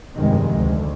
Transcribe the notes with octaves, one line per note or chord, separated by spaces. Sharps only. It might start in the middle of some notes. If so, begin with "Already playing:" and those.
F1 G2 C3 D#3 G#3
D2